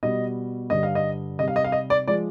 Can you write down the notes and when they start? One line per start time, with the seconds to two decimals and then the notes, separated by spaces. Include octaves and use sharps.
0.03 B2 G3 D#5
0.70 G2 D3 G3 D#5
0.83 F5
0.95 D#5
1.39 C3 D#5
1.42 G3
1.48 F5
1.56 D#5
1.64 F5
1.72 D#5
1.90 D5
2.08 F3 G#3 D5